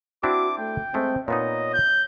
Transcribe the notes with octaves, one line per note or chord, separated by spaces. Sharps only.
C4 D4 E4 F#4 D6
A3 G5
G#3 A3 C4
A#2 B3 D#4 C#5 D#5
G6